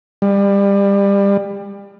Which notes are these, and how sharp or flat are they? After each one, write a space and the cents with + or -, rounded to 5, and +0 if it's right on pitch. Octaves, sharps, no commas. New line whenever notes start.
G3 +25